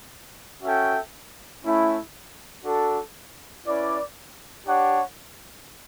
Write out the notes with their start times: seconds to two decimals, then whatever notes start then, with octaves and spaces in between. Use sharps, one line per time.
0.63 C#4 F#4 A4 E5 G5
1.64 A3 C#4 E4
2.65 D4 F#4 A4
3.66 C#4 E4 B4 D5
4.66 D4 G4 C#5 F#5